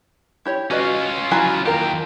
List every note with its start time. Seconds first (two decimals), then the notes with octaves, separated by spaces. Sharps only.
0.45 E4 G4 C#5
0.71 C#4 F4 F#4 B4 D#5
1.31 F#3 E4 G#5
1.66 D#2 F4 G4 A#4